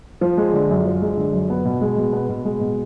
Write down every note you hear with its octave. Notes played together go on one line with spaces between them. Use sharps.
F3
G#3
D3
F#2
F3
G#3
D3
F#2
B3
B2
G#3
B2
B3
B2
G#3
B2